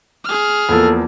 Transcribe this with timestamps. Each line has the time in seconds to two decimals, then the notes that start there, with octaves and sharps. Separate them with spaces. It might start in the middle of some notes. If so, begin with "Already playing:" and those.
0.25 G#4 F6
0.69 E2 F3 A#3 A4